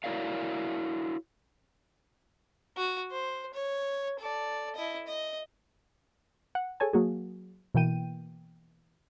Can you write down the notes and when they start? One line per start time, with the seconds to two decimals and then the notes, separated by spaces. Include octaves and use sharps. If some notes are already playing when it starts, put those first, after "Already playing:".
0.04 E4 F#4 A#4 C#5 D5 F5
2.77 F#4
3.11 C5
3.54 C#5
4.19 A4 D5
4.75 E4 D#5
5.07 D#5
6.55 F#5
6.80 G#4 A4 C#5 G#5 A5
6.93 F#3 A#3 F#4 G#4
7.74 B2 E3 A#3 G5 D#7